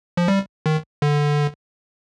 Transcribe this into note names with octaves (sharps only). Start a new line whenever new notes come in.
F3
G3
D#3
D3